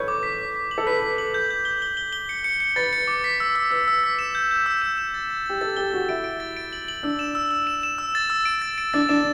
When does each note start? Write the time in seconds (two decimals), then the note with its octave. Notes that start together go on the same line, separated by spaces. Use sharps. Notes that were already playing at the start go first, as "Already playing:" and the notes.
Already playing: A4 B4 C#5 G6
0.08 D6
0.23 B6
0.39 B6
0.55 B6
0.71 F#7
0.78 A4
0.87 B4 B6
1.03 B6
1.18 F#7
1.34 G6
1.50 G6
1.65 G7
1.82 G7
1.97 G7
2.13 G7
2.29 C#7
2.44 C#7
2.60 C#7
2.76 B4 A6
2.93 C#7
3.07 D6
3.24 B6
3.40 E6
3.56 E6
3.71 B4 E6
3.88 E6
4.04 B6
4.19 E7
4.35 G6
4.51 G6
4.66 E6
4.82 E7
4.98 E7
5.14 A6
5.30 A6
5.46 G4 A6
5.61 A4 A6
5.77 G4 G7
5.92 F#4 A6
6.09 E4 D7
6.24 D7
6.40 A6
6.57 D7
6.73 F#7
6.88 F#7
7.03 D4 E6
7.19 E7
7.35 E6
7.51 E6
7.67 E7
7.83 E7
7.98 E6
8.15 A6
8.30 E6
8.45 D7
8.62 A6
8.78 D7
8.93 D4 A6
9.09 D4 E7